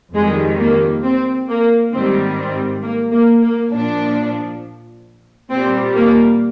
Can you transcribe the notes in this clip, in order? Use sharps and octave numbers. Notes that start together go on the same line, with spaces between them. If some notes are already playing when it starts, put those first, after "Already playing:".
F2 D#3 G3 G#3
A#3
C4
A#3
G#2 D#3 G3 C4
C4
A#3
A#3
A#3
A#2 F3 D4
A#2 G3 C4
A#3